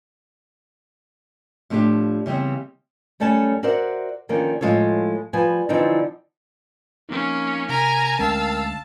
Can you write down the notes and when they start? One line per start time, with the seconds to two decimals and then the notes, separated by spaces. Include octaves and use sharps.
1.70 A2 F3 C#4 D4 G4 F5
2.26 C#3 E3 G3 B3 C4
3.20 F#2 G3 A3 C#4 G#5 A5
3.63 F#4 A#4 C5 D5 E5 F#5
4.29 D3 D#3 F3 A#3 C#4 D4
4.61 A2 F3 G#3 F4 A4 C#5
5.33 F3 G3 B4 G#5
5.69 D3 E3 F3 C4 D4 D#4
7.09 F3 A#3 C4 C#4 D#4
7.69 C3 A#4 G#5 A#5 B6
8.19 D2 G#3 C#4 A#4 F5 G5 A5 E6